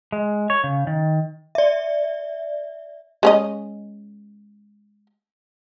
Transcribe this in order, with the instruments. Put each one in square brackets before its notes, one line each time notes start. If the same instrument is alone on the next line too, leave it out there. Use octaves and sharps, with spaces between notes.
[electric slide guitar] G#3
C#5
C#3
D#3
[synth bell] D5 E5
[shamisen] G#3 C#4 D#5